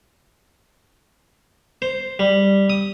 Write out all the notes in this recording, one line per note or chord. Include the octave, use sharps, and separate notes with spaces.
C5
G3
D#6